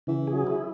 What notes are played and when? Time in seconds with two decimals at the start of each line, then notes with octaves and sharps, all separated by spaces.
0.07 C#3 E3
0.27 G#4
0.34 F#3
0.47 E4